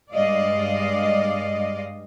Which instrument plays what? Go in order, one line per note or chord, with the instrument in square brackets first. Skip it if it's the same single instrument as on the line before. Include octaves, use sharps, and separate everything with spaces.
[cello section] G2 G#3 D5 D#5 F5